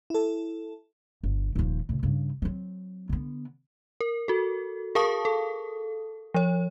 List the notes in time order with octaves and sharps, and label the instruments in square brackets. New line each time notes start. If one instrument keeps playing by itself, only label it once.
[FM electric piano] E4 A4
[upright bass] G1
D#1 F3
A2 C#3
G2 C#3
F#3 C4
D3 B3
[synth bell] A#4
F#4 A4
G#4 A#4 F5 A5 C#6 D#6
A4
F3 C#5